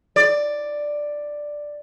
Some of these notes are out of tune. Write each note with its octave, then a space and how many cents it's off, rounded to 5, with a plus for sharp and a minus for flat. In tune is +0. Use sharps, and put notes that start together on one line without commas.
D5 +5